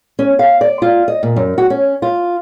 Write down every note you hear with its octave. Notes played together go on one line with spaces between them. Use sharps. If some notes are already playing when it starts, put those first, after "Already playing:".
C#4
F5
D5
F4
D#5
A#2
F#2
F#4
C#4
F4